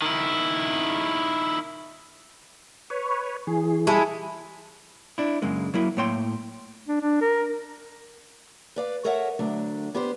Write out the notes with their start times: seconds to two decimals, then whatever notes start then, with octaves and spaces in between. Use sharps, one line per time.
0.02 D#3 E4
2.90 B4 C#5
3.47 E3 G#4
3.87 G3 G#3 E4 A4
5.18 D4 E4
5.42 F#2 C#3 G#3 A#3
5.74 F#3 A#3 E4
5.97 A2 A#3 C#5 G5 C6
6.88 D4
7.01 D4
7.21 A#4
8.76 B4 D5 F5
9.04 A4 A#4 C#5 D#5 E5 F#5
9.39 D2 F#3 A3 D4
9.94 B3 D4 G4 B4 C5